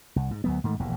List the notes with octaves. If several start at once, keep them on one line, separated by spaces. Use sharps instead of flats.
C2
G#2
D2 F#3 B3
G#2 D#3 A3
E1 A#1 D#2 G#2